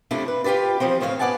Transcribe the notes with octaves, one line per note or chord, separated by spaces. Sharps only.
F2 C3 F3 A3 D4 E4
B4
F4 G4 G#4 B4 D5
E3 F3 G3 C4
A2 C#3 C#5 D5 F5
B3 D5 F#5 G#5 A5